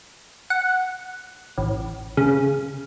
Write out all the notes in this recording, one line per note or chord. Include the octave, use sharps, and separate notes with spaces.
F#5
A1
C#3